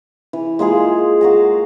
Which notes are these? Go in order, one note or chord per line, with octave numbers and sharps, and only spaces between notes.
E3
G#3 A#3 F4 G#4
F#4 F5 A#5